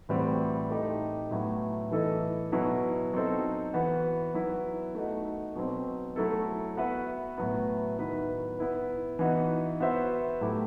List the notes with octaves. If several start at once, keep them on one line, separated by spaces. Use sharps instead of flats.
A2 E3 G3 C4 F#4
A3 D#4 G4
A2 F#3 B3
E3 A3 E4 A4 D#5
B2 F#3 B3 E4
F#3 C4 D#4 A4 C5
E3 B3 F#4
F#3 B3 E4 B4
A3 D#4 F#4
B2 F#3 C4
F#3 A3 E4 A4
B3 F#4 B4 E5
A2 F#3 B3
D#3 F#3 B3 E4 B4
B3 E4 B4
E3 B3 D#4 F#4
B3 F#4 C5 E5
A2 F#3 A3 E4 G4